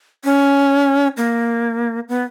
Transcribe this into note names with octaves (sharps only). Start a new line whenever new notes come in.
C#4
A#3
B3